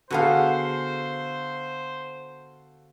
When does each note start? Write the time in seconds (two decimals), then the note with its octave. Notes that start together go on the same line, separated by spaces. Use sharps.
0.11 D3 B3 F#4 G#4 A4 C5 F5